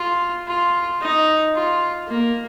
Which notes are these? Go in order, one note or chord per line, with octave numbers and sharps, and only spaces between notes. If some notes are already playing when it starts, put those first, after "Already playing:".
Already playing: F4
F4
D#4
F4
A#3